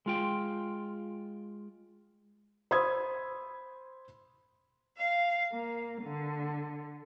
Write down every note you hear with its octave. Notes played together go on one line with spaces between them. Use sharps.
G#3 F4 G5
C5 B5 D#6 E6 G#6
F5
A#3
D3